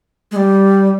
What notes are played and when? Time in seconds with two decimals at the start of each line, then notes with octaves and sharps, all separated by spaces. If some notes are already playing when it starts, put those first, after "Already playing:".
0.31 G#3
0.36 G3